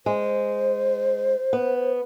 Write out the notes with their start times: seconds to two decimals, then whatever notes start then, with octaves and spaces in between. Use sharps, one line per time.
0.06 G#3 C5
1.53 B3